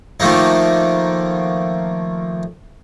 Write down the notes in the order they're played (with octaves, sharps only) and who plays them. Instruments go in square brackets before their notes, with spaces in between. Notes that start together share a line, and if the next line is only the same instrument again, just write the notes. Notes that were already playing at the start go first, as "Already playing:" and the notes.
[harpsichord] D#3 F3 A3 A#3 D#4